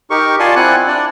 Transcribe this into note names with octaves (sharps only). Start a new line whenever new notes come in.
D#4 G4 A#4 C#6
F4 D5 G#5 A5 C6
C4 E4 F#5 G#5 F#6
D4 D5